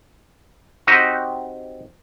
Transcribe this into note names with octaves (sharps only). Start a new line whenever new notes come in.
C4 D#4 F#4 G4 D#5